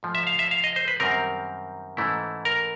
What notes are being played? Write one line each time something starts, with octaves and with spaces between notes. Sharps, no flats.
G#2 F3 A3
E5
F5
E5
F5
D#5
C5
B4
F#2 D#3 G3 C4 A#4
G#2 E3 A3 C#4 E4
A#4